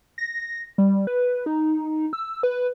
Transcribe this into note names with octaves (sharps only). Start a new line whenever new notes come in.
A#6
G3
B4
D#4
E6
B4